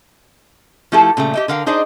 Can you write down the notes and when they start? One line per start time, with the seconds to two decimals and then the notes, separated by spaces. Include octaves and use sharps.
0.92 F3 A3 E4 G4 A4
1.17 A#2 C#3 G3 A3
1.34 G4 D#5 E5
1.48 D3 A#4 F5 G5
1.66 D4 D#4 G#4 C5 D5 D#5